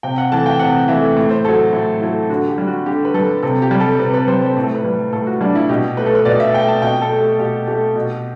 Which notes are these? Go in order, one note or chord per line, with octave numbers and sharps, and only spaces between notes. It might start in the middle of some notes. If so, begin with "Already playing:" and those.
C3 G5
F#5
E3 A3 A5
G5
C3 F#5
E3 A3 E5
A2
C5
F#3 A3 A4
A2 E4
F#3 A3 E4
D3 F#4
G4
G3
F#4
D3 G4
B4
G3 A4
C3 A4
G4
G3
A4
C3 B4
B4
G3 C5
C5
A2
A4
B4
G3
A2 A4
F#4
G3 D4
E4
B2 G4
A3 B4
A4
B4
B2 D5
E5
A3 G5
A5
B2 G5
A4
A3
G4
B2 G4
A3 G4
B2